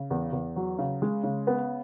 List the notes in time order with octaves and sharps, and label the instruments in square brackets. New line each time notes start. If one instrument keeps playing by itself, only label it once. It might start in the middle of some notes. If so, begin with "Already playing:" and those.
Already playing: [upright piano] C#3
E2
E2
F#3
C#3
G#3
C#3
B3